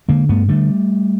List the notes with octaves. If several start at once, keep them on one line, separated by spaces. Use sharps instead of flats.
D3 G#3 A#3
G2 A3 B3
D3 G3 A3